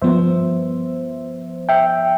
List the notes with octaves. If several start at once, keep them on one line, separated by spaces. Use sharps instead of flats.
G2 F3 B3 C5 E5
E5 G5